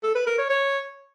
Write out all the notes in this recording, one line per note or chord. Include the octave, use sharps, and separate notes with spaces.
A4
B4
A#4
C#5
C#5